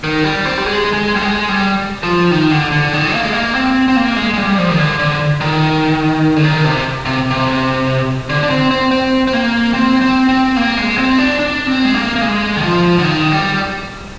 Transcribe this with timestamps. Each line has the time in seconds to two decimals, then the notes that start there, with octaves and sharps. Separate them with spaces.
0.04 D#3
0.24 G3
0.45 C4
0.58 G3
0.66 G#3
0.93 G#3
1.16 G3
1.21 G#3
1.49 G3
2.03 F3
2.31 D#3
2.51 D3
2.72 D3
2.93 D#3
3.13 A#3
3.23 G#3
3.33 A#3
3.55 C4
3.88 C4
3.96 A#3
4.17 G#3
4.34 G#3
4.37 G3
4.58 F3
4.71 D#3
4.79 D3
4.99 D3
5.41 D#3
6.36 D3
6.44 D#3
6.65 C3
7.05 C3
7.31 C3
8.29 D3
8.43 D4
8.50 C4
8.71 C4
8.91 C4
9.27 C4
9.33 A#3
9.74 C4
10.02 C4
10.29 C4
10.56 A#3
10.77 G#3
10.98 C4
11.19 D4
11.39 D4
11.67 C4
11.85 G#3
11.94 A#3
12.16 A#3
12.21 G#3
12.57 D#3
12.63 F3
12.99 D3
13.04 D#3
13.32 G3